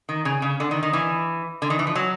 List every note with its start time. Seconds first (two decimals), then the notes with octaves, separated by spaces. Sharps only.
0.09 D#3
0.25 C#3
0.42 C#3
0.60 D3
0.71 D#3
0.83 D#3
0.93 E3
1.62 D3
1.70 D#3
1.79 E3
1.87 F3
1.96 F#3